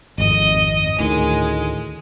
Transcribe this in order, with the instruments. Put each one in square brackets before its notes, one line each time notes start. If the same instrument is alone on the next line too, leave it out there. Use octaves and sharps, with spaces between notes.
[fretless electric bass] G#1 F2 [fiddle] D#5
[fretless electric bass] D2 A2 D#3 [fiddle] G#3